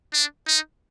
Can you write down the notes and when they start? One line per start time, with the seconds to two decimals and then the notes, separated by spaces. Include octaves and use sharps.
0.14 D4
0.48 D#4